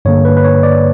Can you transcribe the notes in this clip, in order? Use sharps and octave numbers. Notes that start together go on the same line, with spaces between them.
G2 D3 A#3 C#5
B4
B4
C#5
D5